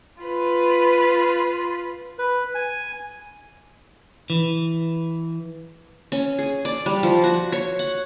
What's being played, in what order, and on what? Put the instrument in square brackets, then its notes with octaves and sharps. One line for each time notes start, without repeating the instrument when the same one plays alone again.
[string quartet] F4 B4
[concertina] B4
G#5
[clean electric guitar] E3
[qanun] C#4
G#4
D5
G3
F3
F#4
C#5
F#5